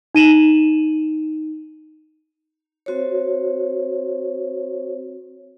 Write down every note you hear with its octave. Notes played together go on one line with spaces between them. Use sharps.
D#4 D#7 E7 F#7
C4 F#4 C5 C#5